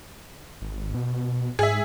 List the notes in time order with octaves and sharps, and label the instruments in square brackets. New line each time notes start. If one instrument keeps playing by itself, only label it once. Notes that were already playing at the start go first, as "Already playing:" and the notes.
[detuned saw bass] G#1
B2
[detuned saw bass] G#2 [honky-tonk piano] G#4 E5